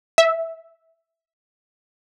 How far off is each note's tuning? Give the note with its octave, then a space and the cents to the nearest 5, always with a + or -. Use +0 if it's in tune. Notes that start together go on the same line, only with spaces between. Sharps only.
E5 -5